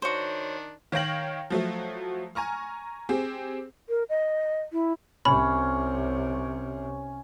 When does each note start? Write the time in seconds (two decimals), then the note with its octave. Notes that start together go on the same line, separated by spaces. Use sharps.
0.02 D#3 D4 F#4 C5 C#5
0.92 D#3 C#5 F5 G5 A#6 F#7
1.50 F3 F#3 A3
2.35 G#5 A#5 C#6 F6
3.09 C4 G4 G#4
3.89 A#4
4.09 D#5
4.72 E4
5.25 C2 C3 C#4 B5